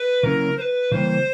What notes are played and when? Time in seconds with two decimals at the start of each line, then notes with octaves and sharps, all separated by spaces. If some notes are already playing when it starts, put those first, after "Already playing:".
Already playing: B4
0.23 C#3 F#3 A#3 C#4 E4 A#4
0.57 C5
0.61 B4
0.92 C#3 E3 G3 A#3 C5